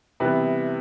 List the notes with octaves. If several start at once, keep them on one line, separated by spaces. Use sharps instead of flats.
C3 E3 G3 B3 B4